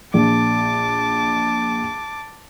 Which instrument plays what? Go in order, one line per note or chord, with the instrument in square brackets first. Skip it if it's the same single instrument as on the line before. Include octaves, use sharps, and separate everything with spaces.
[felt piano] A#1 [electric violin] A5 D6